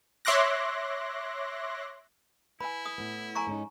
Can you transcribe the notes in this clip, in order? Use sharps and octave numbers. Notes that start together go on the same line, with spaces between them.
C#5 E5 C6 D6 F#6 A#6
E4 B4 G#5 B5
D#6
A2 B3
G#5 A#5 C#6
G#2 C#4 D#4